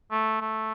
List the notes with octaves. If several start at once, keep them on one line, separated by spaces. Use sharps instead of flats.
A3
A3